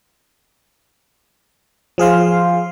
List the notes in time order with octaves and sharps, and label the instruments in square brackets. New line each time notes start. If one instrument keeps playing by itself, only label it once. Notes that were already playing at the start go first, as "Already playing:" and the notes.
[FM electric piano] F3 G#4 F5 C6